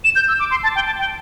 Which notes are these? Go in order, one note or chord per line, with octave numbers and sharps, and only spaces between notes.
E7
G6
E6
D6
C6
A5
G5
A5
G5